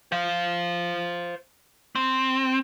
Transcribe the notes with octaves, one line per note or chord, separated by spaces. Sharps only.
C5 F5
C4